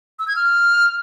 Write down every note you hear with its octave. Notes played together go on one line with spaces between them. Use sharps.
E6
G#6
F6